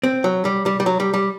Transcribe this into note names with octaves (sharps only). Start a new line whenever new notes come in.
C4
F#3
G3
G3
G3
F#3
G3
G3